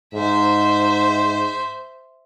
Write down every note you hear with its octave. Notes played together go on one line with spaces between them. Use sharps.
G#2 C5 E5